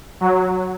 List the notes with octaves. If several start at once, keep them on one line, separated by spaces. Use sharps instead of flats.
F#3